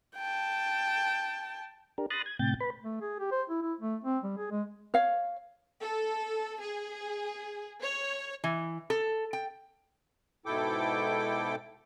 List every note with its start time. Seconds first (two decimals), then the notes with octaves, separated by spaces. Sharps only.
0.17 G5 A5
1.98 D4 G4 A#4
2.10 B5 C6 D#6 F#6 A6 A#6
2.26 G#6
2.39 A2 C3 G5 G6 A6
2.60 B4 B5
2.84 A3
3.01 G#4
3.20 G4
3.31 C5
3.50 E4
3.62 E4
3.80 A3
4.04 C4
4.24 G3
4.38 G#4
4.51 G#3
4.94 C#5 F5
5.82 A4
6.62 G#4
7.82 C#5
8.44 E3
8.90 A4
9.33 G5
10.46 G#2 B2 E4 A4 G5 D6